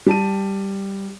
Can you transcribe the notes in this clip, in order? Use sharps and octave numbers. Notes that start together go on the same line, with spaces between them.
G3 A5 D#7